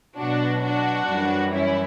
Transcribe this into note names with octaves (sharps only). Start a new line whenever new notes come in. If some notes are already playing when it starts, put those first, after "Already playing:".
B2 F#3 D4 F#4
D4 F#4
F#2 E3 G3
C#4 E4